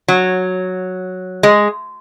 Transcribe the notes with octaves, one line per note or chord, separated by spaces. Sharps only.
F#3
G#3